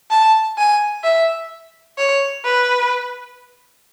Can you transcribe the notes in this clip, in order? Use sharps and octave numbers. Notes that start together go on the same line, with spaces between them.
A5
G#5
E5
C#5
B4